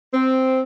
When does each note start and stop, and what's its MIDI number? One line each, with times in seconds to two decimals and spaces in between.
0.14 0.61 60